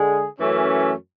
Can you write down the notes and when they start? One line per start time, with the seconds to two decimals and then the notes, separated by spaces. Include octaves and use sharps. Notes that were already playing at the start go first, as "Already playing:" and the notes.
Already playing: D3 G#3 G#4
0.39 F#2 E3 A3 C#4